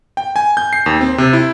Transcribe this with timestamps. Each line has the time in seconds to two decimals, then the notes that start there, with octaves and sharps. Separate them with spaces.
0.17 G5
0.36 G#5
0.57 G6
0.73 C7
0.86 D#2
1.01 C4
1.18 C3
1.33 E4